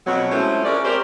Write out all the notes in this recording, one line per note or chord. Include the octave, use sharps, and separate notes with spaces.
F2 B2 F#3
F3 G#3 A3 C#4 E4
G#3 C#4 A#4 D5
C4 G4 A#4 C5 D5